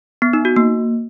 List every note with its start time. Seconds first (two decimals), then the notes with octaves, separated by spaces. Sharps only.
0.22 B3
0.33 D#4
0.45 F#4
0.56 A#3